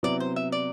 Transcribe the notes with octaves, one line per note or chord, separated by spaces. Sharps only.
C3 F#3 B3 E4 D5
C5
E5
D5